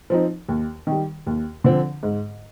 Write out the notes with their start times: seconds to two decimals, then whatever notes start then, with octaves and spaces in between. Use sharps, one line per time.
0.10 F3 C4 D#4
0.49 D#2
0.87 D#3
0.92 G3
1.27 D#2
1.64 D3 F3 C4
2.03 G#2